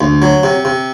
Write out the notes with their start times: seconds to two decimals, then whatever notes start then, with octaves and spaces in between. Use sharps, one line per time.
0.01 D2
0.22 F#3
0.43 C3
0.65 C3